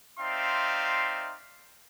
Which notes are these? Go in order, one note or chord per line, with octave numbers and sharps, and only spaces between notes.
C4 D#4 D5 E5 F5 C6